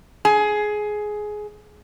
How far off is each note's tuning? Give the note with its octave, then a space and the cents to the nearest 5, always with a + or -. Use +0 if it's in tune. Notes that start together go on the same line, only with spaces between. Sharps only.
G#4 +15